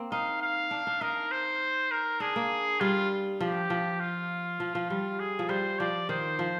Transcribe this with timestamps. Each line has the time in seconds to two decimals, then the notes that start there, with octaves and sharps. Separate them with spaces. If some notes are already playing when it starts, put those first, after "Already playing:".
Already playing: A#3 C4
0.12 D#4 F5
0.42 F5
0.71 D4
0.87 D4
1.01 D#4 A#4
1.31 C5
1.91 A#4
2.20 D4 G#4
2.36 A#3
2.80 G3 F4
3.40 F3 G4
3.70 F3
4.00 F4
4.60 F3
4.75 F3
4.90 G3 F4
5.19 G#4
5.39 F3
5.49 G3 C5
5.79 F3 D5
6.09 D#3 C5
6.39 F3